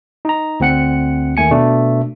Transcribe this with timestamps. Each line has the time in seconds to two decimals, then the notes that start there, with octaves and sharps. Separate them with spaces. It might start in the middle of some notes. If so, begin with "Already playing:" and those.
0.25 D#4 A#5
0.60 D2 C4 F#5 C#7
1.37 D#2 D#3 A3 G#5 C#7
1.50 B2 A3 D4